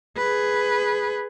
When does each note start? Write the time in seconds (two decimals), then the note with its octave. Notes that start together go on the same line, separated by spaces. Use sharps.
0.17 G#4 B4